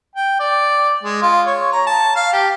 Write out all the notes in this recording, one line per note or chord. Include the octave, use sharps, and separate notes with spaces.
G5
D5
G#3
F4
C#5
A#5
A5
F5
G4